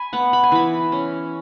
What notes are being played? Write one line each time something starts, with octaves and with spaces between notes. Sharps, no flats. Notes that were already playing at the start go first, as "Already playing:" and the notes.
Already playing: G#5 B5
B3 F#5
B5
G#5
E3 B5
C#4